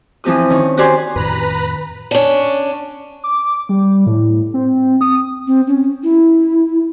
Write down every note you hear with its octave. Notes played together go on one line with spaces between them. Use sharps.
E3 F3 C4 G4 D#6
D#3 C#4
F#4 G4 C5 D5 G#5 C6
F2 A2 D#3 B4 A#5 B5
C#4 D4
D6
G3
A2
C4
D#6
C4
C#4
E4